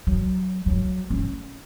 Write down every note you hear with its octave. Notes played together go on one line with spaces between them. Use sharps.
F#3
F#3
C#4